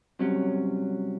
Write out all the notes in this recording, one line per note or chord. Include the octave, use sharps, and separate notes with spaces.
C2 C3 F#3 C#4